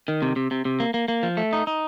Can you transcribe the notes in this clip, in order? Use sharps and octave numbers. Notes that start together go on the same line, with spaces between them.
D#3
C3
C3
C3
C3
A#3
A#3
A#3
F3
A3
D#4
D#4